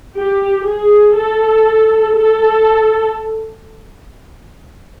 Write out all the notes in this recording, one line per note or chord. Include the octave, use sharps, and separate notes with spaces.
G4
G#4
A4
A4